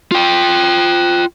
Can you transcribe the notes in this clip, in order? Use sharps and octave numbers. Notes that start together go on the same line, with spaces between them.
F4 G5